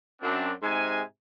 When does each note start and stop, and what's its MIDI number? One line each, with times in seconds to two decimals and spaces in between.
0.22 0.51 42
0.22 0.51 60
0.22 0.51 62
0.63 1.01 44
0.63 1.01 48
0.63 1.01 56
0.63 1.01 80